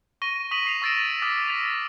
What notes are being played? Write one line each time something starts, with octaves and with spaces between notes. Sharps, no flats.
C#6 A#6 D#7 G7
C#6 D#6 B6 D#7 F#7
C#6 C7 F7
C#6 E6 A6 A#6 D7 E7
D6 D#6 F6 A#6 B6
A6 B6 F7